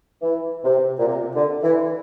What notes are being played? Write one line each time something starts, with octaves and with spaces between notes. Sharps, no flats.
E3
C3
A#2
C3
D3
E3